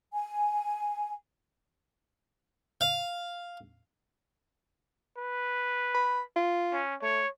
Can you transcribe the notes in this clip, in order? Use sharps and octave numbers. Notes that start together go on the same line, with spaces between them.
G#5
F5
B4
B5
F4
C#4
A3 C#5